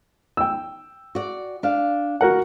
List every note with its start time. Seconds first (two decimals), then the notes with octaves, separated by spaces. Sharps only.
0.37 G5 E6
1.15 F#4 D5
1.63 D4 F5
2.21 F#4 A#4 F#5